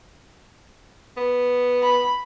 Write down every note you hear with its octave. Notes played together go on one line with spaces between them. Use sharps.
B3
B5